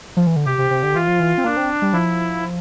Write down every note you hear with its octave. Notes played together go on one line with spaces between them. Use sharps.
F3
E3
D3
C3 G4
C3
C3
D3
E3 F4
F3
E3
C4
A#3 D4
C4
G3
F3 E4